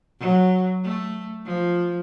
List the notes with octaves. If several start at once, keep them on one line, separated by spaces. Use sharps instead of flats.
F#3
A3
F3